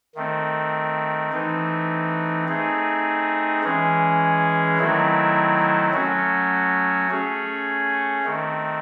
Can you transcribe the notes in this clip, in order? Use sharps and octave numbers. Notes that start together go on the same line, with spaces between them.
D#3 A3 C4
E3 A3 C4 D#4
A3 C4 D#4 G#4
E3 G#3 C#4 G#4
D#3 F#3 A3 C4 E4
F#3 A3 C#4 F#4
A3 C#4 G#4 C#5
D#3 A3 C4